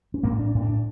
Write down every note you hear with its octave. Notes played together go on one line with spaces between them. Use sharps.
C#4
A2 A#3 C4
D4
A2
D4